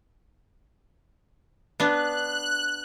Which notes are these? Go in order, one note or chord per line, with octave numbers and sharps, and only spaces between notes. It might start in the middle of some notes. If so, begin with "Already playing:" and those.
B3 D4 F#6